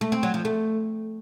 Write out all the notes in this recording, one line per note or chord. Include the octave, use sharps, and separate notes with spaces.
A3
C4
F#3
F3
A3